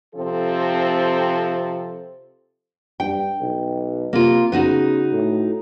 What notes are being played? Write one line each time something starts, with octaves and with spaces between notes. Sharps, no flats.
C3 F3 C4 A4
G2 G5
B1
C3 A#3 F4
C#3 B3 D#4 F#4
A2